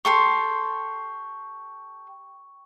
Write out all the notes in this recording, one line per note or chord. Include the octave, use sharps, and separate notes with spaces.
G4 A4 C6 C#6